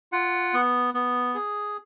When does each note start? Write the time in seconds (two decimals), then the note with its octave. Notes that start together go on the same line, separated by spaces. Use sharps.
0.12 F4 F#5
0.54 B3
0.94 B3
1.35 G#4